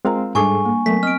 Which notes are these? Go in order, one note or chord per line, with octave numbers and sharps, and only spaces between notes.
G#3 C4 F4 A#4 F5 A#5
G#2 G3 D4 G#4 A4 G#5 C#6 D6
A#3
F#3 A3 B3 A#4 B6
C4 D#5 F6 D7